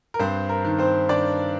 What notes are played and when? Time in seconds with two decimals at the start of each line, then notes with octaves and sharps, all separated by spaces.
0.14 A#4
0.19 G2 C4 C5
0.49 A#4
0.65 D#3
0.79 C4 C5
1.09 D#3 D4 D5